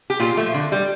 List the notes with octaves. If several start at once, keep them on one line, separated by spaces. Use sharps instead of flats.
G4
A#2 F4
F3 A3
D3
G3